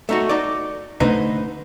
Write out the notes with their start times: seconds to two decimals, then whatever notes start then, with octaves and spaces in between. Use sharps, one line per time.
0.09 A3 D#4 F#4
0.29 D#4 D5
1.00 D3 A3 D#4 B4 C5